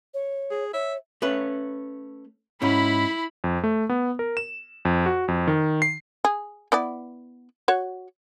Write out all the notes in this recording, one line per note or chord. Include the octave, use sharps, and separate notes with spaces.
C#5
G#4
C#5 E5
A3 C#4 B4
G#2 C#4 E4 B5
F2
A3
B3
A#4
E7
F2
F#4
F2
D#3
C7
G#4
B3 E4 D5
F#4 C#5 F#5